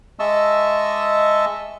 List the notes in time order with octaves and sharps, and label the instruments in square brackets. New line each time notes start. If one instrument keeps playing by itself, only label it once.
[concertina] G#3 D#5 E5 A5 C#6 E6